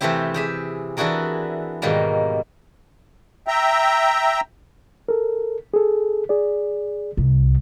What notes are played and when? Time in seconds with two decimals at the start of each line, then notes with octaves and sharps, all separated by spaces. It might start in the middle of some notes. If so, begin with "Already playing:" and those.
0.01 C3 E3 A3 C4 E4 G4
0.34 G4 G#4 E5
0.97 E3 D4 E4 F#4 G#4 A#4
1.82 G#2 B2 D#3 G3 A#3
3.48 E5 G5 A#5
5.09 A4 A#4
5.74 G#4 A4
6.29 G#4 D5
7.17 C2